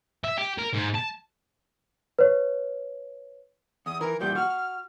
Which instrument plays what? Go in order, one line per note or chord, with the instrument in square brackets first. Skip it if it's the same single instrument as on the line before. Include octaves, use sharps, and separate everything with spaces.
[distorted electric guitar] E5
G4
A#4
G#2
A5
[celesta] B4 C#5
[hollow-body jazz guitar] E2 [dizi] D#6
[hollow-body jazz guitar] E3 [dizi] A#4
[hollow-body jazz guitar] E2 A#2 G3 [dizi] G6
[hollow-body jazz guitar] F#4 [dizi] F6